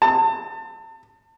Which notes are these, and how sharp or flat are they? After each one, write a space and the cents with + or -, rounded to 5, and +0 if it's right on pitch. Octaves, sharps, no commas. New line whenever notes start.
A5 +35